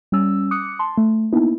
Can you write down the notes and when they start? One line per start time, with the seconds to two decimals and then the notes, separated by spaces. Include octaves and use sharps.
0.12 G3 C#4 E6
0.51 D6 D#6 F#6 C#7
0.79 A5 C6
0.97 A3
1.33 A#3 B3 D#4 E4